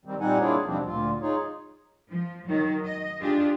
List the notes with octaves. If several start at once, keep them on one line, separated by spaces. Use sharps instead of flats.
D#3 G3 C4
A#2 G3 C4 D#4 F#5 G#5
A#3 D4 E4 F4 G#4 C#5
D#2 B2 F3 G3 C4 D4
D2 A#2 F4
D#4 F4 G#4 C#5
F3
D#3 F#3
D#5
D4 F4 G4 G#4